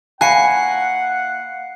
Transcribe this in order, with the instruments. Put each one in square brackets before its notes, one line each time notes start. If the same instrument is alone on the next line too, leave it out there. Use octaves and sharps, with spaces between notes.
[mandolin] A#3 E4 C#5 [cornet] F#5 [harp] G#5 [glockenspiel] F#6 C7 C#7